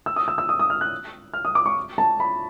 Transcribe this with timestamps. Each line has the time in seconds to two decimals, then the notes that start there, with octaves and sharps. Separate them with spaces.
0.06 E6
0.16 D#6
0.28 E6
0.38 E6
0.49 D#6
0.59 D#6
0.70 F6
0.81 F#6
1.34 F6
1.45 D#6
1.55 D6
1.66 C#6
1.98 A5
2.20 B5